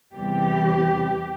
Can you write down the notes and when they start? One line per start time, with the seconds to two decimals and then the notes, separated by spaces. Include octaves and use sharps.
0.14 E2 C3 E3 G3 G4